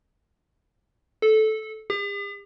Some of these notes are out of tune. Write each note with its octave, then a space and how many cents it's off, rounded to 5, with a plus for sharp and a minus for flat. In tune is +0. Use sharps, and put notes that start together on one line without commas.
A4 -15
G4 +45